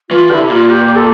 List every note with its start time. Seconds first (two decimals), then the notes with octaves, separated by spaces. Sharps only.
0.10 E3 F4
0.30 D3 G4
0.33 E4
0.40 C3
0.50 A#2 F4
0.70 G4
0.96 A4